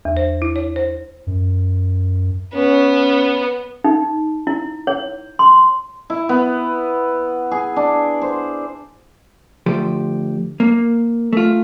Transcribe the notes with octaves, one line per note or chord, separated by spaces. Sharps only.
E2
C5
E4
C#5
C5
F#2
B3 C#4
D#4
E4
C#5
C6
E4
B3
G#4
D4
C5
D2 F3 G4
A#3
A3 F4